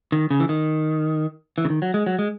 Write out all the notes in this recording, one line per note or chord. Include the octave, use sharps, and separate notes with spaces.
D#3
C#3
E3
D#3
E3
C#3
D#3
F#3
G#3
F#3
G#3